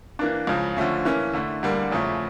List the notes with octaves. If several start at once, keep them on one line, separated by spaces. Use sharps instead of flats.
E3 A#3 D4
C#2 C#3 F3
D3 F3 A3 C#4
E3 A#3 C#4 E4
D3 A3 E4
D2 D3 G3 A#3
E2 C#3 F3 A3 E4